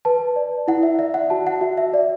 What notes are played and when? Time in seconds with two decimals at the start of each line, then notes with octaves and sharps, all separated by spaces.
0.05 B4 A5
0.36 D5
0.68 E4 F#5
0.83 E5
0.99 D5 E5
1.14 F#5
1.30 F#4 A5
1.47 F#5
1.61 F#4 E5
1.77 E5
1.94 D5